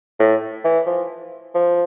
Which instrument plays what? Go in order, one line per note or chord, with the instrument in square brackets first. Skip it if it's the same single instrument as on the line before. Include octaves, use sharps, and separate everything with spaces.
[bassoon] A2
E3
F3
F3